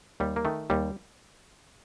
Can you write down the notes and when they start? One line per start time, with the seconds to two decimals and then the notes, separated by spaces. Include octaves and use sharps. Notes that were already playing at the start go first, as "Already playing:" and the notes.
0.20 D#2 G3
0.36 A#3
0.45 D#3 A3
0.70 D#2 G3